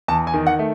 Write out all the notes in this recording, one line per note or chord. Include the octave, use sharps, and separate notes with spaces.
E2 A5
G#5
D#3
F#5
A3